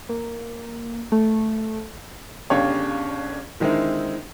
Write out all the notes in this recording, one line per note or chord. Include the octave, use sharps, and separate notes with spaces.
A#3
A3
G1 C#3 D4 G4 C#5 F5
D3 D#3 G#3 C4 D#4 E4